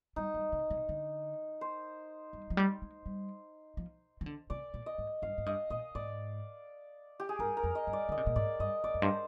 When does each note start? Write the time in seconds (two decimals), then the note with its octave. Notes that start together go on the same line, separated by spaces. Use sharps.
0.16 G3 D#4
0.34 G3
0.52 C3
0.71 C3
0.89 D3
1.61 C5
2.33 G3
2.50 F3
2.57 G3
2.82 G#3
3.06 G3
3.77 F3
4.21 D#3
4.26 D3
4.50 C3 D5
4.74 A#2
4.86 D#5
4.98 G#2
5.22 G2 F5
5.38 G#2
5.46 G2 D#5
5.70 A#2 D#5
5.95 G#2 D5
7.20 G4
7.29 G#4
7.39 G2 A#4
7.57 A#4
7.63 F2
7.75 D#5
7.87 G2
7.93 D5
8.09 D3 D#5
8.17 C3
8.27 A#2
8.36 G#2 D5
8.60 G2 D#5
8.84 F2 D5
8.94 F2
9.02 G2 C5